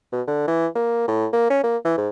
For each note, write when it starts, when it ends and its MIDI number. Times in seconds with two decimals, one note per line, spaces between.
0.12 0.22 47
0.27 0.43 50
0.48 0.67 52
0.75 1.07 58
1.08 1.27 45
1.33 1.50 58
1.50 1.59 61
1.63 1.77 58
1.85 1.93 52
1.97 2.09 44